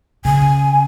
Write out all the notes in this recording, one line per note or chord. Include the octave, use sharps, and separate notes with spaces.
C#3 G#5